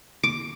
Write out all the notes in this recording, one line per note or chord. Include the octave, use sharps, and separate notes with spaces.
D6